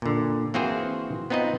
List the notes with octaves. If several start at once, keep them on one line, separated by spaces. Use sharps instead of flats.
A#2 D3
E3 A#3 C4 F#4 G#4 C5
B3 C4 D#4 F4 D#5